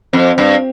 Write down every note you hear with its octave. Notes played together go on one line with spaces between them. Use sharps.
F2 C4
G2